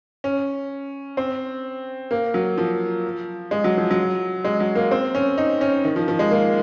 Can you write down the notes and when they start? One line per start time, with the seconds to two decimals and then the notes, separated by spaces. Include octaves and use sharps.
0.24 C#4
1.17 C4
2.11 A#3
2.34 F#3
2.58 F3
3.51 G#3
3.64 F#3
3.77 F3
3.91 F#3
4.45 G#3
4.60 F#3
4.75 A#3
4.91 C4
5.15 C#4
5.38 D#4
5.61 C#4
5.84 D#3
5.96 F3
6.08 F3
6.19 G#3
6.31 A#3